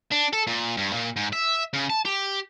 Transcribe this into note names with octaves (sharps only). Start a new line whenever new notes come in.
D4
A4
A#2
G2
A#2
G#2
E5
C#3
A5
G4